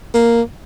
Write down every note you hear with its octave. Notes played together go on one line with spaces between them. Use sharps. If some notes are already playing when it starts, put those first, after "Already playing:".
A#3